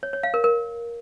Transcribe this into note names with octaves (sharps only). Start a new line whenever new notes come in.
C#5
C#5
F5
A#4
A#4